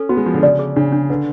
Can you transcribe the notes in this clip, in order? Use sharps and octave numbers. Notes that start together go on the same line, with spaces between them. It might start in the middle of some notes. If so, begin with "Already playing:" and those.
Already playing: C#4 A4
B3 F#4
G#3
F3 F#4
D3
C#3 D5
G#4
C#3 D4
D4
D3 B4